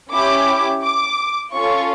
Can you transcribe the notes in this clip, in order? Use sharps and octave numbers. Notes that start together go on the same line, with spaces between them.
C#4 E4 G4 D6
D6
C#4 F4 A4 C#6